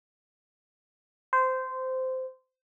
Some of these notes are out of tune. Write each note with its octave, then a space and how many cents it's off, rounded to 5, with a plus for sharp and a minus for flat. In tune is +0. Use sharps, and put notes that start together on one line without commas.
C5 -15